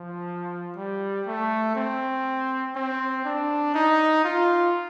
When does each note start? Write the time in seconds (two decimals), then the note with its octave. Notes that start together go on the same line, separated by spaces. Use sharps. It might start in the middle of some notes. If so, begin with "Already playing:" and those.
Already playing: F3
0.77 G3
1.27 A3
1.76 C4
2.76 C4
3.25 D4
3.75 D#4
4.24 F4